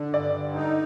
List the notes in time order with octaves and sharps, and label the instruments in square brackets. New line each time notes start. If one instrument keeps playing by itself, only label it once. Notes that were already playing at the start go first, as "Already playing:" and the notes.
Already playing: [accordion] D3
[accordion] G2 [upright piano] D5
[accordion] D3
D#4